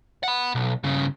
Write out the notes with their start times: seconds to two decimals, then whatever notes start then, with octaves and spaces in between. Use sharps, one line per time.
0.23 F#5 B5
0.55 B1
0.83 G2 C#3